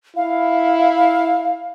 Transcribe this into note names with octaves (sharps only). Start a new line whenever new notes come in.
E4 F5